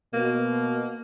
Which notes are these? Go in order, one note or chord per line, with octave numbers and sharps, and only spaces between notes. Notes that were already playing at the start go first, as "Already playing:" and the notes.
B2 A#3